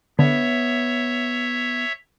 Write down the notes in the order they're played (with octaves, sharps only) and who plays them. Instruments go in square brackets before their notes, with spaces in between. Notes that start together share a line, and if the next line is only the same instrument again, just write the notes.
[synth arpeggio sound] D3 [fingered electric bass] B3 [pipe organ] C#5 E5